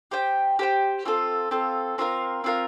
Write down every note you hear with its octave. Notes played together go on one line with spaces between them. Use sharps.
G4 C5 G5
G4 C5 G5
C4 F4 A4
C4 F4 A4
C4 F4 A#4 F5
C4 F4 A#4 F5